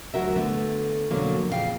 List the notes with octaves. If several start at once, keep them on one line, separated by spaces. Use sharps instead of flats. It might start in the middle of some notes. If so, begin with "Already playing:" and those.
D2 A2 F#3 F#4 A#4 E5
D3 A3 B3
F2 B2 D3 F#3 A#3
F2 A#2 C#3 D#4 F5 G5